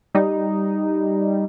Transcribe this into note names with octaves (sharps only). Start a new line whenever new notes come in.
G3 D#4